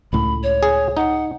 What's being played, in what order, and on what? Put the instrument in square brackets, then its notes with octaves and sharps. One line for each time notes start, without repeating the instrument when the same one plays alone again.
[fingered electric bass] C#2 A2 [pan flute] B5
[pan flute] C#5
[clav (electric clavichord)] G#4
[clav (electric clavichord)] D#4 [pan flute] F#5